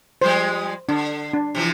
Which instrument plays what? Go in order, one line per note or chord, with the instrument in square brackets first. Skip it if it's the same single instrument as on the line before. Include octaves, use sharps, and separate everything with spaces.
[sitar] F3 G3 G#3 [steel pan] C5
[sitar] D3 [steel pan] D4
[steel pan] D4
[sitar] C3 E3 F3